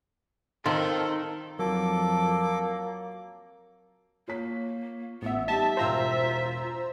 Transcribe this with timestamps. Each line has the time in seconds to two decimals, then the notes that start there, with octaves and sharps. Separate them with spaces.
0.66 D#3 C4 D#4 F4 A4
1.59 F2 F#3 A#3 A4 D6
4.28 A#3 F4 C#5 B6
5.22 A1 B3 E5
5.48 G3 D#4 G4 E5 A5
5.77 E1 F4 C5 F5 G5 A#5 E6